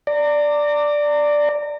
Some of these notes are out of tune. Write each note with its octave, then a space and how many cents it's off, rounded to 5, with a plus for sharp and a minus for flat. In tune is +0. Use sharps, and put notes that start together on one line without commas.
D5 +0 A#5 -35